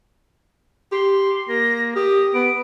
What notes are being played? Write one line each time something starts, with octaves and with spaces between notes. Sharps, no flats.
G4 C6
A#3 A#6
G4 D#6
B3 D7